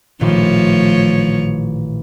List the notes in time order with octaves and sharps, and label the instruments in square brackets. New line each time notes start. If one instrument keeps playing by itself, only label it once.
[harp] A1 A#2 D#3 [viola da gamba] F3 A3 C#5